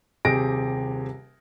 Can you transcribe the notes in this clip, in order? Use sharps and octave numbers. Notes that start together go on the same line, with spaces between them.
D#1 C3 G4 G#4 A#6 D7